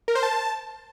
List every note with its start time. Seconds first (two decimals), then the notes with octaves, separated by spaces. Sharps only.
0.08 A#4
0.15 C5
0.23 A5